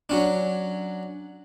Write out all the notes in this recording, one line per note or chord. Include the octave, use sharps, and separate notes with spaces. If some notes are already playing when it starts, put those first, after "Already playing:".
F#3 C#4 D4